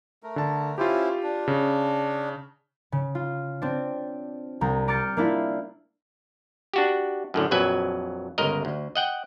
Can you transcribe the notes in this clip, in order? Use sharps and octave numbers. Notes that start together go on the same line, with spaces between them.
A3 A#4
D3 A5
C#4 E4 F4 G4 C5
D4
C#3
C#3
F4
C4 D4
C2 A#5
A#5 D6 F6 G6 A6 C#7
A#3 D4 E4 F4
D4 F#4 G4
F#2 A2 D3
A#1 F2 F#3 B4 G#5
G1 C#2 A#4 D#5
D2
D#5 F#5 G5